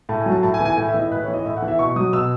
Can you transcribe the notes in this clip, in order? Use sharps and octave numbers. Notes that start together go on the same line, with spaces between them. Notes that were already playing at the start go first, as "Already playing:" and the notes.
A2 A5
G#5
F#3
A5
A2 A5
G#5
E3
G#5
A2 G#5
E5
E3
D#5
A2 B4
C#5
E3
D#5
A2 E5
F#5
E3
E5
B2 C#6
F#3 D#6
B2 E6